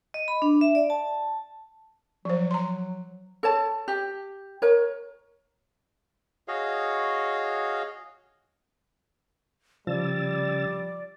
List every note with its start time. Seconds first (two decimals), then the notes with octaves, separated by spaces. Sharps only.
0.14 D#5
0.28 B5
0.42 D4
0.61 E5
0.75 D5
0.90 A5
2.25 F3 F#3 C5
2.51 A#5 C6
3.43 A4 C#5 A5
3.88 G4
4.62 A#4 C#5
6.48 F#4 G#4 C#5 D#5 F5
9.87 C#3 F3 G3 D5 E6 A6